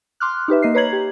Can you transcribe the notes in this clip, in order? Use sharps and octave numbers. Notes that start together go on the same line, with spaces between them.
C6 D6 F6 F#6
D#4 G4 B4 E5
A#3 D#5 C7
B4 C#5 A#5 G#6 F#7
G4